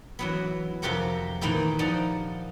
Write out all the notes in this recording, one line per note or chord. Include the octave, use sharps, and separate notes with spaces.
E3 F#3 B3
F2 C3 F4 G4 A#4 F#5
A#2 D#3 E3 D#4 E4 G4
F3 D#4 D5 F#5